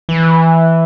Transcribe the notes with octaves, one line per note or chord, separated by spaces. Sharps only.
E3